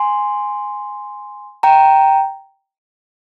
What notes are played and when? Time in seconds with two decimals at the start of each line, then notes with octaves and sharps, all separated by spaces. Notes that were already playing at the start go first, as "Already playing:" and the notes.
Already playing: G#5 C6
1.63 G5 A#5